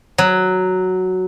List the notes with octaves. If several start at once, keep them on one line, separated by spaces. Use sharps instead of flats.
F#3